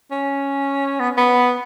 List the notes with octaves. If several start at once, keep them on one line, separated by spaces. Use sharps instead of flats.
C#4
B3
B3